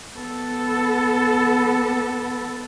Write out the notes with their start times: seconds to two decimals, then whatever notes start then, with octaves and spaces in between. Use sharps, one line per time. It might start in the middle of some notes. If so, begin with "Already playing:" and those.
0.15 B3 A4